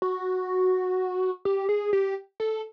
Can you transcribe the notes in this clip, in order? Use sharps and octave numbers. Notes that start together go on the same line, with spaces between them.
F#4
G4
G#4
G4
A4